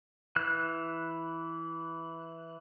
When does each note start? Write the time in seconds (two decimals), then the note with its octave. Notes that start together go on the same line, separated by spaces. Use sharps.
0.36 E3 F#6